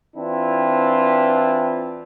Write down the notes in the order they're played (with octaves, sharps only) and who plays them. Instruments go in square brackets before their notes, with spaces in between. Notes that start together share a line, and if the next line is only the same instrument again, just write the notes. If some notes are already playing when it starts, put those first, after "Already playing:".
[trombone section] E3 C4 D4 E4 F4